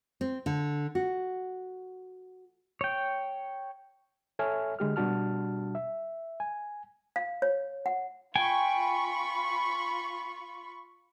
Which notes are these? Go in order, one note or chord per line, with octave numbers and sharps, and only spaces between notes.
C4
D3
F#4
C#5 G5
A4 C#5 E5 G#5 F6
D3 G#3 G4 F6
B2 G3 D4 F#4 A5 F6
E5
G#5
F5
C#5
F#5
F4 G5 G#5 B5 C#6